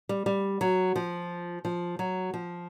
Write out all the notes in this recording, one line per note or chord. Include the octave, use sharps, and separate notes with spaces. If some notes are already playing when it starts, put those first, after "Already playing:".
G3
G3
F#3
F3
F3
F#3
F3